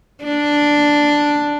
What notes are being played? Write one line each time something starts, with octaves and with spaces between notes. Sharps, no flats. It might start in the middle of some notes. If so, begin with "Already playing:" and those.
D4